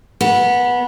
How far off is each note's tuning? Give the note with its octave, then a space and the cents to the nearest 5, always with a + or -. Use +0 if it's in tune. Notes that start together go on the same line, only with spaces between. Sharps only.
B3 -15 A5 +45